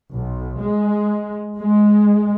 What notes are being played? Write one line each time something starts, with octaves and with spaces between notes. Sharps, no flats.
B1
G#3
G#3